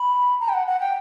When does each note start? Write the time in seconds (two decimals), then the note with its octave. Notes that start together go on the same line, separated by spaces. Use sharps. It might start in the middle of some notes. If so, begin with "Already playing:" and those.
Already playing: B5
0.40 A#5
0.49 G5
0.54 F#5
0.67 F#5
0.80 G5